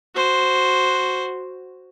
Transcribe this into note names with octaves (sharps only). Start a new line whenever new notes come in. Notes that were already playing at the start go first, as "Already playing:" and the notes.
F#4 C5